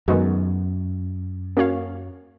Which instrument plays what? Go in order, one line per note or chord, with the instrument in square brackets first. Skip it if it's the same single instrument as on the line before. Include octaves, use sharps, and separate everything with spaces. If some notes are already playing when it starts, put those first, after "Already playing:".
[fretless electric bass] F#2 [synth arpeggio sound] D#3 G#3 B3 D#4 F#4
[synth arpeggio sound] A#3 C#4 F#4 C#5 F5